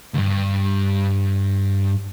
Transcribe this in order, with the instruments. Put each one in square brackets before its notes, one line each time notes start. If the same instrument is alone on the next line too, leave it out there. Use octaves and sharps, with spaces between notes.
[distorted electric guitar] C#2 G2